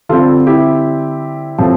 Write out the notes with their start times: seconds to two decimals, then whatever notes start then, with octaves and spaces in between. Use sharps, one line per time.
0.09 D3 G3 C4 F4 A4
0.47 E4 G4
1.58 A2 F3 A3 C4